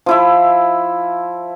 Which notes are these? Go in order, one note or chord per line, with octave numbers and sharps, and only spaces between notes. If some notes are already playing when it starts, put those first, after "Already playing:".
F3 E4 E5